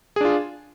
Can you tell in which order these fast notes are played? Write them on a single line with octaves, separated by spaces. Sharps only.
G#4 D4 F4